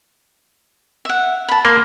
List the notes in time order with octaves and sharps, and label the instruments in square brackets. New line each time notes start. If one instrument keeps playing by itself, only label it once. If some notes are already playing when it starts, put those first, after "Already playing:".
[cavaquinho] E5 F#5
A5 B5
[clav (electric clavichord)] A#3 [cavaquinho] C6